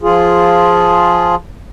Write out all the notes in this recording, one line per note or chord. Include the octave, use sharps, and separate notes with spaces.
F3 F4 G#4